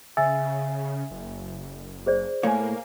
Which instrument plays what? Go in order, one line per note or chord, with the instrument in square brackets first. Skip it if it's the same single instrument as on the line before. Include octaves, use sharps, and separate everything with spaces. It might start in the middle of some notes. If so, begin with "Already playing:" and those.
[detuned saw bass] C#3 [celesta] E5 G#5 A6 [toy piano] E6
[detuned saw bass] F#1
[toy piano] G#4 C5 D5
[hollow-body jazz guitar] A2 A3 C#5 [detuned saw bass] A#3 [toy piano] F5 G#5